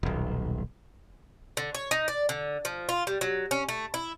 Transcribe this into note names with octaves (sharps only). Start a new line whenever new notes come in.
D#1 B1
D3
C#5
D#4
D5
D3
F3
F4
G3
F#3
C#4
A3
E4